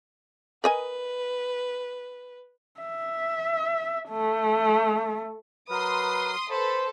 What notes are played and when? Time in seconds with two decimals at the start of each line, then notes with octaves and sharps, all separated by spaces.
0.64 A#4 B4 D#5 G#5
2.81 E5
4.10 A3
5.70 F#3 A#4 B4 C6 D#6
6.51 A4 B4 C5 B5